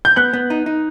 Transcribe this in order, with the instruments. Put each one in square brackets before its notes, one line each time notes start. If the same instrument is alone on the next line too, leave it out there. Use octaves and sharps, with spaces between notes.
[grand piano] G6
[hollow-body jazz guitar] B3 [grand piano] F#6
[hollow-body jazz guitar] B3
D#4
D#4